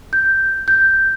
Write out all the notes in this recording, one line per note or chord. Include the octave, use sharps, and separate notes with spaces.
G6
G6